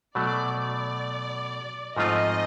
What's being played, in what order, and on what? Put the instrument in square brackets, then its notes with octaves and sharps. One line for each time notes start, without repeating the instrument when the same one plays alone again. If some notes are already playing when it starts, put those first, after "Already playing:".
[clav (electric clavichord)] B2 F#3 A3 [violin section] D5
[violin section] D5
[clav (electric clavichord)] G#2 F3 A3 C4 F4 [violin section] D#5